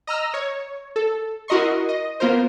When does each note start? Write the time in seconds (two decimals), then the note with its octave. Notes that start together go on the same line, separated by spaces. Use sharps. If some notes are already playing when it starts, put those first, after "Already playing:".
0.07 D#5 A#5 E6 F6
0.34 C#5
0.96 A4
1.48 E4 F#4 A#4 D#5 C6 C#6
1.89 D#5
2.20 A#3 B3 F4 A#4 C5